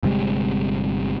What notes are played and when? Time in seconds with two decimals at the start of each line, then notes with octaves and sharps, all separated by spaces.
0.03 G1 C3 G3 G#3